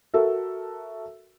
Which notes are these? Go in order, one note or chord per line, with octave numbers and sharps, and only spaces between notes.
F#4 A4 A#4 E5